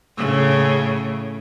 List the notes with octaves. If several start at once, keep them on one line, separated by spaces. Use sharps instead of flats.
A2 C#3